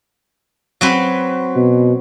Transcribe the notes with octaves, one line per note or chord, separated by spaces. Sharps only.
F#3 C4 B4
B2